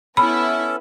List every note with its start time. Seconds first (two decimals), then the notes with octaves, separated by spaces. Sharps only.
0.17 B3 C#4 E4 A4 B5